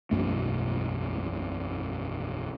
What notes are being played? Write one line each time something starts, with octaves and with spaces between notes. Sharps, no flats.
E1 B1 F#2 A3